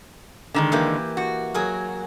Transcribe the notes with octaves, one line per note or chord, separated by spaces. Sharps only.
D3 D#3 G#3
E3 A#3 G4
F#4
F#3 G#4 A#4